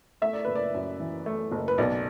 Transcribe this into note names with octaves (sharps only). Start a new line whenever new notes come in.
A3 E5
D5
F#1 B4
D5
F#2
E3
A3
F#1
B4
B1 D5